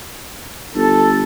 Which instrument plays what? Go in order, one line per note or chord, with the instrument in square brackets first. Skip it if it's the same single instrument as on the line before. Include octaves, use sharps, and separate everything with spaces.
[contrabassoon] G1 [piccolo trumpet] A4